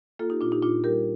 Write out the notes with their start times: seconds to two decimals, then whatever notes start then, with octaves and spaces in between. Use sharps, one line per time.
0.19 A#3 F4 A4
0.30 D#4 G4
0.41 A#2 D4 F4
0.52 D#4 G4
0.62 A#2 D4 F4
0.84 G3 G4 A#4